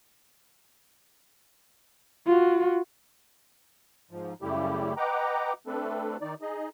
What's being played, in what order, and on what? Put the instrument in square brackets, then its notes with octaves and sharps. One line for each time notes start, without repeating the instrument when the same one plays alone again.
[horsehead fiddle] F4 F#4
[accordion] G#2 F3
F#2 C#3 G3 A3 E4 G4
B4 D#5 F#5 G5 A#5 D6
A3 C4 D4 A4 B4
D#3 D#4 D5
D#4 G#4 D#5